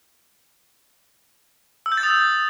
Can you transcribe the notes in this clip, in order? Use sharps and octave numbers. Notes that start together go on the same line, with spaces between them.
E6
G6
A6
D#6